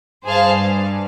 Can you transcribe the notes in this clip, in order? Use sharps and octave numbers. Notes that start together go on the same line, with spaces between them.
G2 G#4 C5 F5 A5